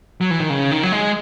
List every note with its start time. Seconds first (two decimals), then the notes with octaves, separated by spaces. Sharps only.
0.21 F#3
0.31 E3
0.40 D#3
0.50 C#3
0.71 D#3
0.83 F#3
0.92 G#3